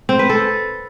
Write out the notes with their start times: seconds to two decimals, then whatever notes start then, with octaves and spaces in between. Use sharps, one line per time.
0.09 C4
0.19 B4
0.30 A4